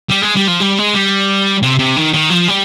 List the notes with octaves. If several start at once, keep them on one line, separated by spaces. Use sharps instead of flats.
G3
G#3
G3
F3
G3
G#3
G3
C3
C3
D#3
D#3
F3
G3